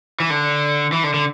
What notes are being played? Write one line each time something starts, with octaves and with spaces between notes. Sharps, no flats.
E3
D3
E3
D3
D3